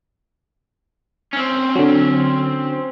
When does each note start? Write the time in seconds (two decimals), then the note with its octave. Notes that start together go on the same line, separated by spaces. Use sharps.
1.33 C4 C#4
1.76 D3 F#3